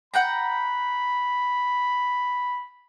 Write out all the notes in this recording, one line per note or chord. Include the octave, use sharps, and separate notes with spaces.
F#5 G5 A#5 B5